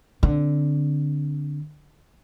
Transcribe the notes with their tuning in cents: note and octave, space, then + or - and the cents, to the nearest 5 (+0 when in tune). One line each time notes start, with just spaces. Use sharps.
D3 +0 C4 +0